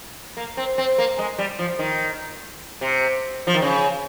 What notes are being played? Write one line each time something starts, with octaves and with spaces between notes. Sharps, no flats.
A#3
C4
C4
A#3
G#3
G3
F3
D#3
C3
F3
D#3
C#3